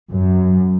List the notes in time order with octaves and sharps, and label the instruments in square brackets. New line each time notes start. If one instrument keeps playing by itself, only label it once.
[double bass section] F#2